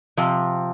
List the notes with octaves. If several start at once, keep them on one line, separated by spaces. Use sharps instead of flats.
C3 F3